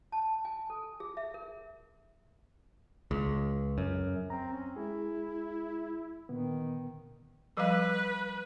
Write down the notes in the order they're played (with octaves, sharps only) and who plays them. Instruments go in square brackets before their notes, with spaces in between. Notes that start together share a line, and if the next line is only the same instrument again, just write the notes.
[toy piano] A5
G#5
A4
G#4
E5
A#4
[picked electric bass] C#2
F#2
[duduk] C4 [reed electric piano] A#5
[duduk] C#4
[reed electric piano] G#3 G#4 [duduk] E4
[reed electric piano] A#2 D3 B3 [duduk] D#3
[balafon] F3 G3 F5 [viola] B4